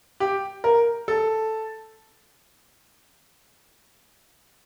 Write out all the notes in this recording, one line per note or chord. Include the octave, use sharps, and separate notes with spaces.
G4
A#4
A4